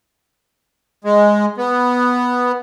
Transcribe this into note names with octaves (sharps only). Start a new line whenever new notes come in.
G#3
B3